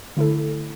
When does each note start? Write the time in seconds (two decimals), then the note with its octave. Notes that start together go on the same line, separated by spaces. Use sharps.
0.17 D3 A3 E4 A4